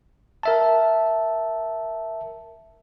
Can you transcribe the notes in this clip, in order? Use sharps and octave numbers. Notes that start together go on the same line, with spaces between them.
A#4 E5 A5